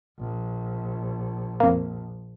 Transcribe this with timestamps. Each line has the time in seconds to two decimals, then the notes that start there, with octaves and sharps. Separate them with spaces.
0.19 A#1
1.60 F2 A#3